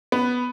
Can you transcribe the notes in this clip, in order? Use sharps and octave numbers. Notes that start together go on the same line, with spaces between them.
B3